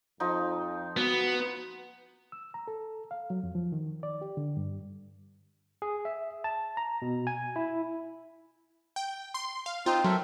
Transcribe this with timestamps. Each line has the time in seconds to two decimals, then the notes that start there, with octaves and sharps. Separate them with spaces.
0.20 F2 F3 D#4
0.97 B3 F#4
2.32 E6
2.54 A#5
2.68 A4
3.11 F5
3.30 F#3
3.43 F2
3.55 F3
3.72 D#3
4.03 D5
4.22 G4
4.37 D3
4.57 G2
5.82 G#4
6.05 E5
6.44 A5
6.77 A#5
7.02 B2
7.27 G#5
7.56 E4
8.96 G5
9.34 C6
9.66 F5
9.86 C4 D#4 F4 C5
10.04 F#3 A4 A#4 E5